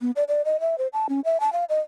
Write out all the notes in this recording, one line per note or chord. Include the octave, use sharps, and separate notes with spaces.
B3
D5
D5
D#5
E5
C5
A5
C#4
E5
A5
F5
D#5